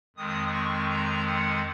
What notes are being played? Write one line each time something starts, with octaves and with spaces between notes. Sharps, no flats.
F2 D#3 G#3 C4 D#6
C#6
A#5
F#5